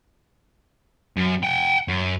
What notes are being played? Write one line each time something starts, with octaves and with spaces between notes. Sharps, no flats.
F#2
F#5 G5
F#2